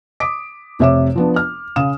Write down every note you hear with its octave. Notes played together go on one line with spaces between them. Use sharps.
D6 D#6 B6 D7
F1 C3 C#5 E5 D6 E7
F3 B3 D4
F6
C#3 F5 D#6 E7